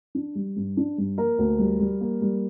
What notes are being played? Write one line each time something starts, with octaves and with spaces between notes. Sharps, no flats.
D4
G3
G2
D4
G2
A#3 A#4
D2
G3
G3
A#3
G3